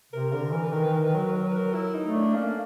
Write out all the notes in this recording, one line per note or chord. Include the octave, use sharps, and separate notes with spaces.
C3 A#4
D3 A#4
E3 A#4
B4
D#3 A#4
B4
D#3 A#4
B4
F#3 A#4
B4
A#4
F#3 B4
A#4
E4
D#4
A3
D4
A#3 C#4